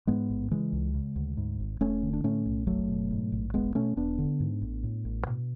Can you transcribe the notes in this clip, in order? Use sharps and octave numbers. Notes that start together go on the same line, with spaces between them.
G#2 G#3 B3
A1
C#3 E3 G#3
C#2
C#3
D2
G#2
G#1
E1 A3 C#4
D3
D4
A2 A3 C#4
B1
F#1 F#3 A3
B2
G#2
A1
E1 G#3 B3
B2 A3 C#4
E1 B3 D4
D3
G#2
A1
A2
A1
B2